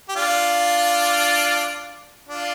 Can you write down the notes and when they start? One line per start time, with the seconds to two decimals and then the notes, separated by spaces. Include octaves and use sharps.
0.09 G4
0.16 D4 F4
2.28 D4 F4